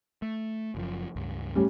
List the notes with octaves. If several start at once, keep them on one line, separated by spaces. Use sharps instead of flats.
A3
F#1 F#2 F3
C#2 G2
A2 G3 C#4